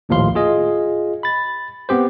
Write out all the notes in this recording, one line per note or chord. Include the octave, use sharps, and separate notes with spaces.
A#1 D#2 A2 F3 F5 C6
F4 G#4 D#5
B5 A6
B3 C4 G4 C5